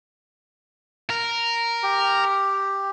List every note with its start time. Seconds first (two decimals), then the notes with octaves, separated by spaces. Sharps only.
1.10 A#4
1.83 G4